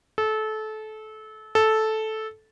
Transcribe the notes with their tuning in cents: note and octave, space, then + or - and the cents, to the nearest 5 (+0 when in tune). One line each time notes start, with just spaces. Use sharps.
A4 -25
A4 -10